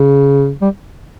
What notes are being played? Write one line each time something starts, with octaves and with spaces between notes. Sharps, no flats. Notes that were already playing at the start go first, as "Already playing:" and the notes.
Already playing: C#3
G3